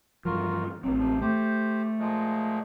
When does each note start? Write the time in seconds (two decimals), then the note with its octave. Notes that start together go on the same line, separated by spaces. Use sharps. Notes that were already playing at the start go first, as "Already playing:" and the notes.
0.25 G2 E3 F3 F4 F#4 A#4
0.84 A1 G2 F#3 C4
0.98 C3 F3
1.21 A3 G4 C5
1.99 A#2 F3 G#3